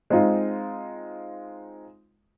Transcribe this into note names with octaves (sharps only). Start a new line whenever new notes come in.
G#3 C4 D#4 F4